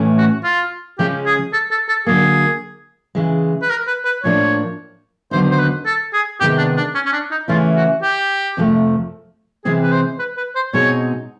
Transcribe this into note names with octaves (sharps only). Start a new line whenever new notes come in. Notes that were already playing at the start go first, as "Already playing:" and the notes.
Already playing: A2 E3 A3 C#4
F#4
F4
C#3 F3 G#3 C#4 G4
G#4
A4
A4
A4
D3 F#3 A#3 G#4
C#3 E3 G#3
B4
A#4
B4
B4
A2 F3 A#3 D4 C#5
D#2 D3 F#3 B3 D#4 C5
C5
B4
A4
G#4
C3 D#3 G#3 B3 G4
D4
D4
C#4
C#4
D4
D#4
C#3 E3 A3 C#4 E4 F4
F#4
G4
F2 C3 F3 A3
C3 E3 G#3 C4 G#4
B4
C5
B4
B4
C5
B2 G#3 C4 D#4 C#5